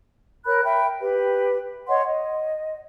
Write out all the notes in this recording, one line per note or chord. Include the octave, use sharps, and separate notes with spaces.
A#4 C#5 B5 F#6
E5 G5 B5
G4 B4
C#5 D#5 F#5 C6
D#5